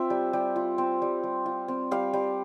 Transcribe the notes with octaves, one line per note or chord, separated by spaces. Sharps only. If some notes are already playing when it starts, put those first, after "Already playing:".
Already playing: C4 F4 C5 E5
G3
G3
F4
C4
G3
G3
F4
C4
G3 F5
G3